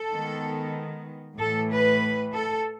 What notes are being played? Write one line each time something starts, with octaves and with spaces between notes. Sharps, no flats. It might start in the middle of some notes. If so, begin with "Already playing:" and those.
Already playing: A4
D#3 G#3 B3
A2 E3 A3 A4
B4
A4